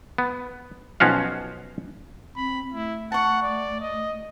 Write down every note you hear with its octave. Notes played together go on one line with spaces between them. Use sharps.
B3
B1 F3 C#4 F#4 F5
C4 B5
A3 E4
F#5 A5 C#6
D5
D#5